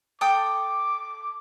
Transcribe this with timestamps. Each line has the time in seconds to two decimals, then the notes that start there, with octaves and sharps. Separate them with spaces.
0.21 A4 G5 D6 D#6